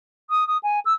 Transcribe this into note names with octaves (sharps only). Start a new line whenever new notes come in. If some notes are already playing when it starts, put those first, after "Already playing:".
D#6
D#6
G#5
E6